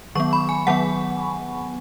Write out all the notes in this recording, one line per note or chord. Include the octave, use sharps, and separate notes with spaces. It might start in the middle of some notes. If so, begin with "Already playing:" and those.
D#3 F#3 B3 C#6
B5
G#5
D#3 F#3 B3 F#5